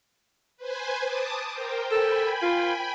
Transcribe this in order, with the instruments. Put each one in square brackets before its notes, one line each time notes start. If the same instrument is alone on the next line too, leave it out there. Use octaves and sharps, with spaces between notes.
[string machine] B4 C5 G#5
A5 D6 D#6
A#4 C5 G5
[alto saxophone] A4 [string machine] G5 G#5 B5
[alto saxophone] F4